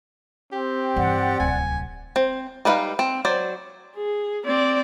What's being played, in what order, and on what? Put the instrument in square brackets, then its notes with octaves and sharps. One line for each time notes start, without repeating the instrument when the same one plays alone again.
[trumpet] C4 [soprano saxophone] G4
[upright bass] G2 E3 [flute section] D5 F#5
[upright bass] D1 C2 [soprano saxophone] G#5
[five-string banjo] C4
G3 D#4 B4 F5
C4
F#3 C5 D5
[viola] G#4
C4 D5